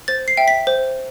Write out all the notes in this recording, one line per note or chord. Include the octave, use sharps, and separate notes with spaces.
C5 A6
C7
E5 G5
B6
C5